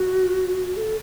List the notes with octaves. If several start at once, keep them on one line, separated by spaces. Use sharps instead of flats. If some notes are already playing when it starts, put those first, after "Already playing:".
Already playing: F#4
A4